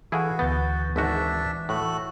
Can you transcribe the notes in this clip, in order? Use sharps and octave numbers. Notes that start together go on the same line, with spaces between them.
E3 E4 F#4 G#4 A4 F5 F#5
D2 B3 G6 A6
G#1 G#2 D4 F#4 E5
A2 A3 F#4 F#6